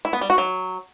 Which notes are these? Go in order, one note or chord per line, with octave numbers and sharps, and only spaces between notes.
E4
B3
G3
F#4
F#3